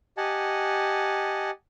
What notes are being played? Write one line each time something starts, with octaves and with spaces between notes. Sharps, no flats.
G4 D#5 F#5 G#5 A5